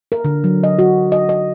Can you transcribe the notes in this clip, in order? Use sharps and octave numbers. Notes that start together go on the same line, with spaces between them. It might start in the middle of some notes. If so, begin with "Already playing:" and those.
A#4
D3
F#3
D#5
F#4
D#5
D#5